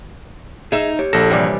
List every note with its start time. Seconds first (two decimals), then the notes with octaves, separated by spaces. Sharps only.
0.72 D#4 G#4 E5
0.99 G4 C#5
1.13 A#1 A4 A#6
1.30 C3 E3 G3